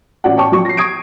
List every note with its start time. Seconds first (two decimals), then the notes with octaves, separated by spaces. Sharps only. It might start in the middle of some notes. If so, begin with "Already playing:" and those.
0.24 A1 F#4 D5 F#5
0.37 C#5 G5 A5 C#6
0.52 F3 F#3 F#4 C#6
0.65 A#6 C7
0.77 C#6 D#6 G#6 D7